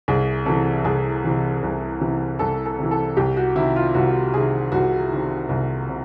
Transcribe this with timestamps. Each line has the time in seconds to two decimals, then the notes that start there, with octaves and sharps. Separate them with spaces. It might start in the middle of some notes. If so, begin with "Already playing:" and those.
0.08 C2 G#4
0.46 C3 E3 A4
0.84 C2 G#4
1.24 C3 E3
1.63 C2
2.01 C3 E3
2.39 C2 A4
2.66 A4
2.79 C3 E3
2.91 A4
3.17 C2 G4
3.37 F#4
3.55 C3 D#3 E4
3.76 F4
3.94 C2 F#4
4.34 C3 D#3 G#4
4.72 C2 F#4
5.11 C3 D#3
5.49 C2
5.89 C3